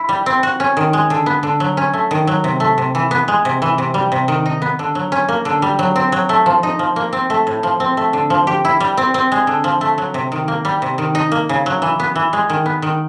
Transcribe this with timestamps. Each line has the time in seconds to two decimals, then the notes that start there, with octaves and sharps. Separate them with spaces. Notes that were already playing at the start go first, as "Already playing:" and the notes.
Already playing: E4
0.09 G3
0.26 C4
0.43 F#4
0.60 C#4
0.77 D#3
0.93 G#3
1.10 D3
1.26 B3
1.43 D3
1.60 F#3
1.77 C#4
1.94 A3
2.11 D#3
2.27 F#3
2.44 C3
2.60 A3
2.78 C3
2.95 E3
3.11 B3
3.28 G#3
3.45 C3
3.62 E3
3.78 C3
3.94 G3
4.12 C3
4.28 D#3
4.46 D#4
4.62 B3
4.79 D3
4.95 F#3
5.12 C#4
5.29 A#3
5.45 D3
5.62 G3
5.79 F#3
5.96 C4
6.12 F#3
6.29 A3
6.46 F3
6.63 D#4
6.79 F3
6.96 A#3
7.13 C4
7.30 A3
7.47 A2
7.63 F3
7.80 C4
7.97 A3
8.13 D3
8.30 F3
8.47 G4
8.65 E4
8.80 G3
8.97 C4
9.14 C4
9.32 G#3
9.47 D3
9.64 F3
9.81 A3
9.98 F#3
10.14 C3
10.32 D#3
10.48 A#3
10.65 G3
10.82 C3
10.98 D#3
11.15 D#4
11.32 A#3
11.49 C#3
11.66 F#3
11.82 E3
12.00 B3
12.16 E3
12.33 G#3
12.50 D#3
12.66 B3
12.82 D#3